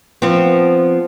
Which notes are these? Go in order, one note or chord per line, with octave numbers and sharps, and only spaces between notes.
F3 B3 C4